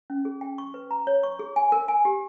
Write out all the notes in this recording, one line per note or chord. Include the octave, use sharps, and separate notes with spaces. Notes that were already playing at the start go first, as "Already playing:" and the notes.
C#4
G#4
G5
C#6
B4
A#5
C#5
C#6
G#4
G#5
A#4
G#5
G4